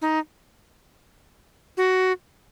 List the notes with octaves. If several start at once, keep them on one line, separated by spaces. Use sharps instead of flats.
D#4
F#4